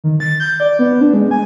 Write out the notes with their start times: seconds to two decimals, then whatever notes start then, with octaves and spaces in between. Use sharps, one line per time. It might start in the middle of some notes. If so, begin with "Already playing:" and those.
0.04 D#3
0.20 A6
0.40 G6
0.60 D5
0.79 B3
1.01 D4
1.14 G#3
1.31 G#5